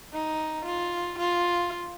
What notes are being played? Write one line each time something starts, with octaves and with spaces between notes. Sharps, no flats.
D#4
F4
F4